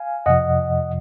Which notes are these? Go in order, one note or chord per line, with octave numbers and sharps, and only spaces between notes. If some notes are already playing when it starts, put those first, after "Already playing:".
Already playing: F5 G#5
F2 C3 F3 D#5 F#5